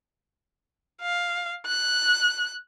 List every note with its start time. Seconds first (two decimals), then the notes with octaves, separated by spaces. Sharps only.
1.02 F5
1.67 F#6